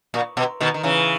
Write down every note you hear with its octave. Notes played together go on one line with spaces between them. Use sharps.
A#2
B2
B2 D#3
D#3
C#3 E3